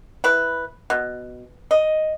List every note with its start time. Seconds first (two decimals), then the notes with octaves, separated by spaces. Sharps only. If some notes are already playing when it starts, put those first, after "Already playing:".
0.24 E4 B4
0.90 B2
1.71 D#5